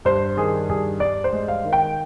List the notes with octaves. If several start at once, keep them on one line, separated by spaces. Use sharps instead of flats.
G2 C5
D#3 G#4
G2 G#4
G2 D5
C5
G#3
F5
D#3
G5